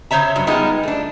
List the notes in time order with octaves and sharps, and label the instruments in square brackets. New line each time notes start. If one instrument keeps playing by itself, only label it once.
[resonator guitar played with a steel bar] C#3 C5 C#5 E5 A#5
G2 F#3
G3 G#3 B3 D#4 F4
A3 D4